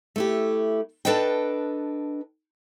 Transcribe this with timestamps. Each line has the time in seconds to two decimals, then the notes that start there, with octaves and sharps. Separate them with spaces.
0.16 A3 E4 G4
1.05 D4 A4 B4 D#5 G5